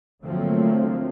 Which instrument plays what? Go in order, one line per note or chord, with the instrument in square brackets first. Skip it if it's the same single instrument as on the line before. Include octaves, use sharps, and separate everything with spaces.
[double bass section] D3 F3 F#3 A3 A#3 C4